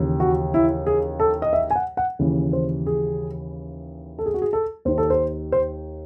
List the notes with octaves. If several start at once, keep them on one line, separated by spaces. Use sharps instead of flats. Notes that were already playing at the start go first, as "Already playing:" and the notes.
Already playing: D#2 C#3 E3
F#4
E4
G#4
A4
D#5
E5
G#5
F#5
F#5
D#2 C#3 E3
C5
G#4
A4
G#4
F#4
G#4
A4
D#2 D#3 C5
A4
C5
C5